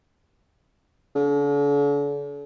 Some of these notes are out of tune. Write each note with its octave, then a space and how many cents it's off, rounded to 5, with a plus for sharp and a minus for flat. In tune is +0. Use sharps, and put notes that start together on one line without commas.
D3 -45